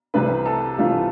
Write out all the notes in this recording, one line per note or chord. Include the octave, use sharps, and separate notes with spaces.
C2 C3 E3 A3 B4
A4
C2 C3 E3 A3 F4